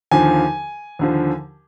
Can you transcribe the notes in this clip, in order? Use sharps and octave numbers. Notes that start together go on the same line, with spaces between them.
D#2 D3 F3 G#5
D#2 D3 F3